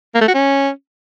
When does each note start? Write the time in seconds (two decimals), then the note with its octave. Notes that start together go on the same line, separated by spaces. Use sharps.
0.15 A#3
0.21 A3
0.28 F#4
0.34 C#4